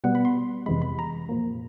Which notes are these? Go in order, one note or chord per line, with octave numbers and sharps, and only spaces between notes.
B2 G3 B3 F#5
B5
C6
F2 C3 E3 G#3 B5
B5
A#5
A#2 F3 A#3